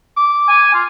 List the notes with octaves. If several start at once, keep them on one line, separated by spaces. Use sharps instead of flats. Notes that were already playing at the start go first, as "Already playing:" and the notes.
D6
G#5
F4